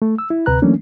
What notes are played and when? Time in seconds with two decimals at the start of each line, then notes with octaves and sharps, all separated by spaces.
0.02 A3
0.18 E6
0.30 E4
0.46 D2 C3 B4 A#5 F#6
0.62 E3 F#3 A3 A#3 C#4 D4